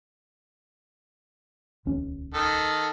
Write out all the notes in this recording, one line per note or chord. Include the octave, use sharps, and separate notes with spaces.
D#1 C#2 C#4
D#3 A4